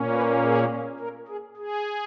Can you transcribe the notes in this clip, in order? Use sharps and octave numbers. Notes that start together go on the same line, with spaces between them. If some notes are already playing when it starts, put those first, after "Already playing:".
Already playing: A#2 A#3 C#4
B4
G#4
A#4
G#4
G#4